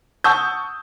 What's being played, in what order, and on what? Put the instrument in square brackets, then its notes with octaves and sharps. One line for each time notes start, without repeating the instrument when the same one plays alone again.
[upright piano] F#5 A5 C#6 D#6 E6 G6